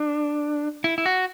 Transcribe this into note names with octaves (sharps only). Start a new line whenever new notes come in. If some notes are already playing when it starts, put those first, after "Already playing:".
Already playing: D4
E4
E4
F#4